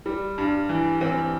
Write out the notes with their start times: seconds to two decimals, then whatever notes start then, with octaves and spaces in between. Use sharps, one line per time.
0.06 G3
0.38 G2
0.69 E3
1.01 E3 C4